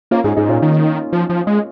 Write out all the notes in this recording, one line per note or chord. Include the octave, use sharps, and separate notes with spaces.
A#3 C#4 F4
G#2 D#4 G#4
G#2 D#4 G#4
A#2 C#4 F4
D#3 A#3 D#4
F3
F3
G#3